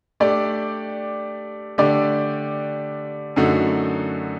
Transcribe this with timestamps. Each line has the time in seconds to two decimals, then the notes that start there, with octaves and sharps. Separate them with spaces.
0.20 A3 D4 G4 D5
1.78 D3 A3 D4 G4 D5
3.36 F#2 D3 A3 D#4 F#4